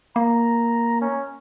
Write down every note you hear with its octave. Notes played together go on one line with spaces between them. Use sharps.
A#3 A#5
C#4